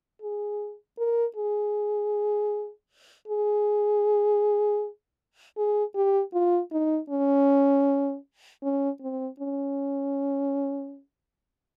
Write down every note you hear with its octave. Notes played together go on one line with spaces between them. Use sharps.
G#4
A#4
G#4
G#4
G#4
G4
F4
D#4
C#4
C#4
C4
C#4